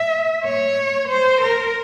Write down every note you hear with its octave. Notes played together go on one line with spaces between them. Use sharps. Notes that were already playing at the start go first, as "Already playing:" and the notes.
Already playing: E5
C#5
C5
A#4